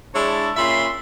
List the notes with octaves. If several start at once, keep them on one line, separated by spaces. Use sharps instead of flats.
G#3 D4 E4 C#5 A5
A#2 C#4 E5 B5 C6